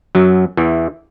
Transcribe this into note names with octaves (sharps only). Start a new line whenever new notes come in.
F#2 F#3
E2 E3